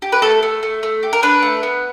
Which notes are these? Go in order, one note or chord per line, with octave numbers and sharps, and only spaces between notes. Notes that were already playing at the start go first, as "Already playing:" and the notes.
G4
B4
A3 A4
A3
A3
A3
G4
A#4
D4 B4
A3
B3